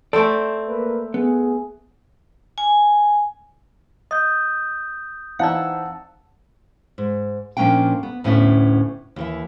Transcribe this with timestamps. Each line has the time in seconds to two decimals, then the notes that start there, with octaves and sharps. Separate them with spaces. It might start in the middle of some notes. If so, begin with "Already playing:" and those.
0.13 A3 C4 A4 C5 D5
0.68 A#3 B4
1.14 B3 G#4
2.58 G#5
4.11 D#5 D#6 G6
5.39 E3 C4 D#4 D5 F5 F#5 A5 E6
6.98 G#2
7.57 A#2 F3 A#3 C#4 D4 G5
8.03 B3
8.24 D2 A2 B3 C#4 D4 E5
9.16 D#2 E3 E5